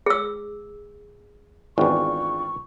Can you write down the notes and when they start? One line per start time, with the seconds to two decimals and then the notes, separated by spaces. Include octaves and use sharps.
0.06 G#4 E6
1.78 G#1 E2 D4 F4 G5 C#6